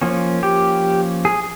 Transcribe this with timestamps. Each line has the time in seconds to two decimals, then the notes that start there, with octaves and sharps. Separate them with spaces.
0.02 F3 A#3 C#4
0.43 G4
1.25 G#4